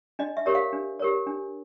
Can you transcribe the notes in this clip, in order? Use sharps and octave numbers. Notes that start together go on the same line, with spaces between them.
D4 D#5
E5
G4 A#4 C#5
F5
D4
G4 A#4 C#5
D4